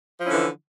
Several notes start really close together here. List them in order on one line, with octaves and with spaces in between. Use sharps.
F3 E4 C#4 D3 E3